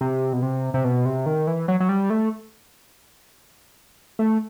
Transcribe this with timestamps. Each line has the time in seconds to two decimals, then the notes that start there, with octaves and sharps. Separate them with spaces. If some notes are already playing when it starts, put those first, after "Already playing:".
0.01 C3
0.33 B2
0.43 C3
0.74 C3
0.84 B2
1.05 C3
1.26 D#3
1.47 E3
1.68 F#3
1.80 F#3
1.89 G3
2.10 A3
4.19 A3